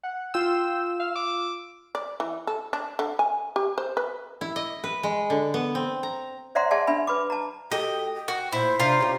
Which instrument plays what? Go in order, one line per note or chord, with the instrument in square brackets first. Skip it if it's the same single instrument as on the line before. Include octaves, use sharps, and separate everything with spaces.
[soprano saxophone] F#5
[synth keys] F4 E6 [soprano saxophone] G5
[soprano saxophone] F5
D6
[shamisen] D5
E3
A4
D4
D3
G#5
G4
C5
B4
[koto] E4
D#5
B4
G#3
D3
B3
C4
A#5
[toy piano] C5 D5 E5 F#5 A#5 C6
G#4 D5 E5 F#5 G#5 A5
D4 E5 G#5 B5
B4 B5 D6
A5 A#5
[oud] F#4 G4 A4 [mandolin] D#5 [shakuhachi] G5
[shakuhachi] G5
[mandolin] F#4 [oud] A#4
[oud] A#2 [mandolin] E4 [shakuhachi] C5
[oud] C3 D4 [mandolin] F4 A#4
[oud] C#4 G4